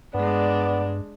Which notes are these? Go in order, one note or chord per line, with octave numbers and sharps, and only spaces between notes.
G2 G#3 B3 D4 D5